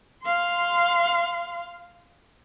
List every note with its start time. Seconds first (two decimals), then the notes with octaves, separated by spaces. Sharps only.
0.23 F5 C6